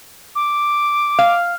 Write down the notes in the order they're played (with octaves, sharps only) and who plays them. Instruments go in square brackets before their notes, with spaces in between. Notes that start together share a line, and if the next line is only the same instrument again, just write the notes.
[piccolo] D6
[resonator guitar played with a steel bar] F5